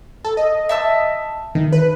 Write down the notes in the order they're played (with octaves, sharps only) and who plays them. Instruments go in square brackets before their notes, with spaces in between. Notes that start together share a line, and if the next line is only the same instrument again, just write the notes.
[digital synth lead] A4
D#5
[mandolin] E5 A5 E6
[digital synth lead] D#3
B4